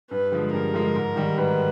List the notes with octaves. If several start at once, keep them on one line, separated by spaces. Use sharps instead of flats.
G2 B4
D3 F3 G#3
G2 A#4
D3 F3 G#3
G#2
D#3 G3
G#2 B4